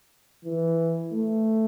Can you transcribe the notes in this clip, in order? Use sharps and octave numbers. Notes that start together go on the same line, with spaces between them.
E3
A3